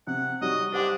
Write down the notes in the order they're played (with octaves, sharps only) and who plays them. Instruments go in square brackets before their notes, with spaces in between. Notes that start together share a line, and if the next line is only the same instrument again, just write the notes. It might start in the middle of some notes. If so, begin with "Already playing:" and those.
[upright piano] C3 [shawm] F#5
[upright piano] F#3 G3 D#4 [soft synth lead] F#4 [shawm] D#5
[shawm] D4 [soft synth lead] G4 [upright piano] C5 F#5 C6